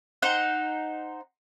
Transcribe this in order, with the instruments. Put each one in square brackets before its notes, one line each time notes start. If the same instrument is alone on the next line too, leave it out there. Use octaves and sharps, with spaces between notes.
[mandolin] D#4 C5 F#5